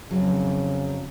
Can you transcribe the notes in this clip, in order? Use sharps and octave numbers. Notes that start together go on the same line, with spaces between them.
F2 C#3 F#3